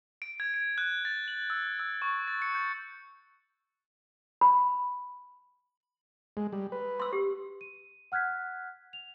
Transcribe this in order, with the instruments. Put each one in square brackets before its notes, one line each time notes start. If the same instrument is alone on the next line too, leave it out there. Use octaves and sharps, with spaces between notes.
[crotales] D7
G#6
D7
F#6
A6
F#7
E6
E6
C#6
A6
C#7
G6
[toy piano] B5
[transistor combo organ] G#3
G3
B4
[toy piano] C6 E6
G4
[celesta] D#7
F#5 F6 F#6 G#6 B6
F7